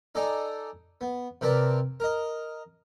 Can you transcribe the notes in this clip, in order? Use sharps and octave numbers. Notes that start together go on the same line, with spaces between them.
D#4 A4 D5 G#5 A#5
B3
C3 C4 A#4 B4 D5 A5
A#4 D#5